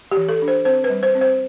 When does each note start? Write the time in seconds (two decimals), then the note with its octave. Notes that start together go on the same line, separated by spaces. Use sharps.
0.11 G4
0.17 E3
0.29 A4
0.42 D4
0.48 C5
0.65 C4 C5
0.84 B4
0.90 G3
1.03 C5
1.15 C4
1.21 C5